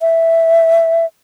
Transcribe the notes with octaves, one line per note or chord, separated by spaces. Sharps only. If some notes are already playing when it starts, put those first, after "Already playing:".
E5